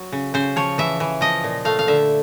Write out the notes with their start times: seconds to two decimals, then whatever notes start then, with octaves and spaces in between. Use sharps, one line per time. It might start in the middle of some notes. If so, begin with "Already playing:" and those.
Already playing: F#3
0.12 C#3
0.34 C#3 C5
0.56 F3 C#5
0.78 E3 E5
1.00 E3
1.21 F3 D#5
1.44 A#2
1.65 A3 F5
1.79 F5
1.88 D3 E5